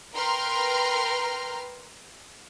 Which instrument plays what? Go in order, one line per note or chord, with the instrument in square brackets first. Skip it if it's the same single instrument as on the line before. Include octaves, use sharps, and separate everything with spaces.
[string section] A#4 B4 G5 A#5 C6 F6